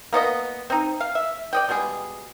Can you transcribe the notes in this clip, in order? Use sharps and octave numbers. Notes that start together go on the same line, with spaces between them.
A#3 B3 C#5 D#5
C4 D#4
F5
E5
D5 D#5 G5
B2 G3 G#3 G#4